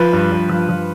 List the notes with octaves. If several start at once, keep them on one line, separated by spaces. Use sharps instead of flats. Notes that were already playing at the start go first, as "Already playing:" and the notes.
Already playing: F3 B4
G2
G2
F3
F3